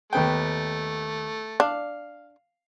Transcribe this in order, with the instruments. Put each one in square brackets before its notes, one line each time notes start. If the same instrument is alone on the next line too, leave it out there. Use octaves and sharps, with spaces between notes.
[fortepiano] D#2 B3 G5 [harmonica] A3
[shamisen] D4 [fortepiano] F5